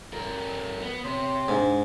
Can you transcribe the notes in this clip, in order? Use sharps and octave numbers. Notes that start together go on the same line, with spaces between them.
G2 A#4
B3
C3 C#5 C6
G#2 D4